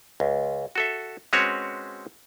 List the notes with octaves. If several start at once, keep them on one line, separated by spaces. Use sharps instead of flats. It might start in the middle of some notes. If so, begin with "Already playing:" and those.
C#2
F#4 A4 E5
G#3 C4 C#4 F#4 B4 C#5